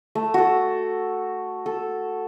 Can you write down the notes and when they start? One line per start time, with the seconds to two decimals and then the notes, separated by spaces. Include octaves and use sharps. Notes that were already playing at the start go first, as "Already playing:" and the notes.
0.15 A3
0.34 F#4 A4
1.66 A4